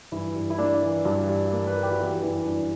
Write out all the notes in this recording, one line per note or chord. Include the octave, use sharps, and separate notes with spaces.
G2 E3 E4
G2
E4
A#3 D4
E3
G2
G2
A#3
B4
E3 A#4
G4
F#4
E3 B3 E4
F#2 E3 E4
G3 D4